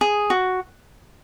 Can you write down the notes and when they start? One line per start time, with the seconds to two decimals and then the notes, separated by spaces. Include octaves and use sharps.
0.01 G#4
0.30 F#4